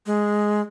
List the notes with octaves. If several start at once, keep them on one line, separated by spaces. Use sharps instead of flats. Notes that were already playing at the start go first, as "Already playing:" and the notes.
G#3